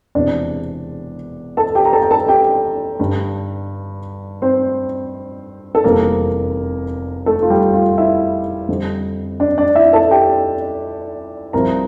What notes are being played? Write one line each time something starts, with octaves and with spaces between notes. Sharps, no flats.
E1 E2 C3 D4 D5
A4 A5
G4 G5
A#5
A4 A5
G5
A4 A5
G4 G5
G2 D3 G3 D4
C4 C5
A4
F1 E2 C3 G3 A#3 C4 A#4
A3 A4
F4
G3 G4
F4
E4 E5
F2 D3 G3
D4 D5
D4 D5
E4 E5
A4 A5
G4 G5
C2 C3 F3 A#4 A#5